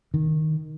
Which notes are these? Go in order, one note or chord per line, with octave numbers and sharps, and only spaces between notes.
D#3